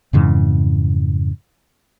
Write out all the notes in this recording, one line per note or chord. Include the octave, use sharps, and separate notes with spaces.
F2 G#2 C#3 E3